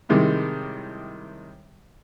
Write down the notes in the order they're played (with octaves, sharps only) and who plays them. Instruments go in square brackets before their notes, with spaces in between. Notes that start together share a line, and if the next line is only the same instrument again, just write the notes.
[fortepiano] A2 C3 D#3 G3 G#3